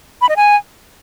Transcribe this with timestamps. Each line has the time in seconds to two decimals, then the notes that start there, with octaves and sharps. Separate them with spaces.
0.22 B5
0.29 D#5
0.36 G#5